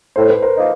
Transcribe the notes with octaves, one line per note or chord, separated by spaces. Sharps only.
A2 C5
B4
A#4 C5
F3 A#3 D#4